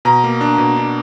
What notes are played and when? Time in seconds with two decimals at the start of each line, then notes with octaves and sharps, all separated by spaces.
0.05 B2 A#5
0.24 A#3
0.41 D4
0.58 B2
0.77 D4